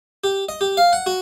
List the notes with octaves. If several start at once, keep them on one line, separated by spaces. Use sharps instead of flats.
G4
D#5
G4
F5
F#5
F#4